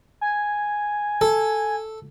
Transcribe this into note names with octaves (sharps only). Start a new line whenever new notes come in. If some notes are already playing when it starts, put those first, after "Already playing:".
G#5
A4